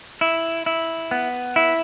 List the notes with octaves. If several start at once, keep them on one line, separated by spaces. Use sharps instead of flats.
E4
E4
B3
E4